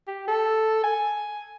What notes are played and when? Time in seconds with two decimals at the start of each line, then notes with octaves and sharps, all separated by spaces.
0.08 G4
0.28 A4
0.84 G#5